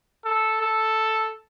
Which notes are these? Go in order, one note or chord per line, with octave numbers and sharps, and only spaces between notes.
A4
A4